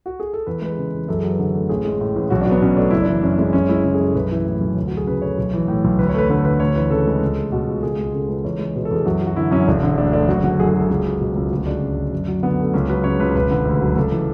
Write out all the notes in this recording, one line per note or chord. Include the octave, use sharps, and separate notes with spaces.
F#4
G#4
A4
E2 B4
G#3 B4
C#3
E2
F#2 A4
G#4
F#3
B4
D3 A4
A3
A1 G#4
G#3
A2
A1
B1 F#4
D4
F#3
B3
B2 C#4
A3 D4
F#1 E4
D4
E3
F#2 C#4
G#3 C#4
F#2 C#4
G#3 E4
C#3 E4
G#4
F#2 A4
B1 B4
E3 E4
A2
B1 C#4
D2
F#3 F#4
G#4
C#3 B4
A3 C#5
B1
E3
A2
B1
D2 B4
C#5
A3 B4
D3 B4
D2 B4
D2 C#5
E3 B4
C#3 A4
G#3
C#2
A3
B2 F#4
C#2
C#2 G#4
G#3
C#3 A4
C#2 B4
E2 C#5
G#3
B2 B4
A4
E2 G#4
F#2 F#4
F#3
F#4
D3 E4
F#2 C#4
E1 D4
D3
D2 D4
A3 D4
F#1 F#4
D3 F#4
F#2 G#4
G#4
F#3
A4
C#2 G#4
F#3
B2
C#2
D2 F#4
G#3 D4
C#3
D2
F#2
F#3
D3 B3
A3
C#2 C#4
F#3 B4
C#3 C#5
C#2 B4
E1 B4
D3
D2
F#3
C#2 A4
E3